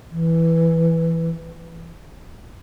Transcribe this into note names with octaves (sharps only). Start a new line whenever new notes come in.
E3